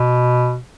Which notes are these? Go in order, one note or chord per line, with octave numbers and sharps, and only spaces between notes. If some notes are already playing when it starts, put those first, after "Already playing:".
Already playing: B2